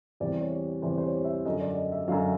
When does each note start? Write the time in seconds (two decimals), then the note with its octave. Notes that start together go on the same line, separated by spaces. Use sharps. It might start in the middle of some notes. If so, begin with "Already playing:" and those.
0.20 E2 C3 E3 G3 D5
0.41 C#5
0.82 E2 C3 E3 G3 C5
0.98 C5
1.04 C#5
1.25 E5
1.45 F#2 D3 F#3 D#5
1.61 D5
1.76 D#5
1.92 E5
2.08 F#2 D3 F#3 F5